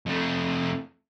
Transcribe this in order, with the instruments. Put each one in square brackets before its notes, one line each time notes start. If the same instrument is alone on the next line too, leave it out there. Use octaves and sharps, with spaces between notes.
[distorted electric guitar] F2 A3